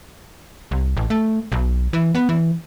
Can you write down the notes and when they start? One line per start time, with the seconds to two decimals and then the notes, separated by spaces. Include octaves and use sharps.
0.71 C2
0.97 A1
1.10 A3
1.52 B1
1.93 E3
2.15 B3
2.29 E3